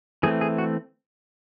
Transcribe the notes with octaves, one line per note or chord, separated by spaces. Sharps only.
E3 A3 C4 G#4
G#4
F#4